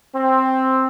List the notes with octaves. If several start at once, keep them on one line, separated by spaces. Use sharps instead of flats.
C4